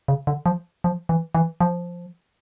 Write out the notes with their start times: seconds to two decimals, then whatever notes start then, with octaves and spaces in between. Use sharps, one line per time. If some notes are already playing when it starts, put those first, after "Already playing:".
0.08 C#3
0.27 D3
0.46 F3
0.84 F3
1.09 E3
1.35 E3
1.61 F3